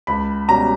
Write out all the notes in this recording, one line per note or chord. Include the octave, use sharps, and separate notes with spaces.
C#2 B5
B2 G3 C#4 A#5